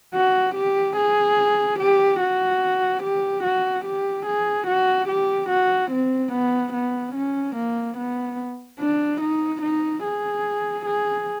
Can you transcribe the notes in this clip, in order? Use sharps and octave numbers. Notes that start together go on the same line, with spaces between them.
F#4
G4
G#4
G4
F#4
G4
F#4
G4
G#4
F#4
G4
F#4
C4
B3
B3
C#4
A#3
B3
D4
D#4
D#4
G#4
G#4